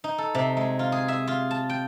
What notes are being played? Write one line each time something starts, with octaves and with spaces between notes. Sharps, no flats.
D#4
A4
C3
G#3
F4
G#4
E5
F4
A5
G5